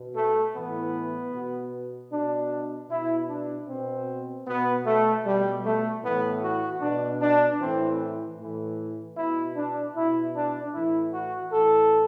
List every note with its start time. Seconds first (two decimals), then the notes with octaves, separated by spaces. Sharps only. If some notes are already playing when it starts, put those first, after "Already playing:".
Already playing: B2
0.15 A3
0.55 A2 E3 B3
1.33 B2
2.11 B2 D4
2.90 B2 E4
3.29 D4
3.68 B2 C4
4.46 B2 B3
4.85 A3
5.25 B2 G3
5.64 A3
6.03 A2 E3 B3
6.41 F#4
6.81 B2 D4
7.21 D4
7.60 A2 E3 C4
8.37 A2 E3
9.16 B2 E4
9.55 D4
9.94 B2 E4
10.34 D4
10.73 A2 E3 E4
11.13 F#4
11.51 A2 E3 A4